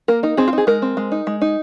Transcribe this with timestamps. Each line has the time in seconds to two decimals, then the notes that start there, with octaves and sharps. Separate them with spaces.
0.08 A#3 A#4
0.23 D#4 A#4
0.37 C4 G#4
0.48 F4
0.53 D#4 G#4
0.67 G#3 A#4
0.82 C4
0.97 G#3
1.12 D#4
1.27 G#3
1.41 D#4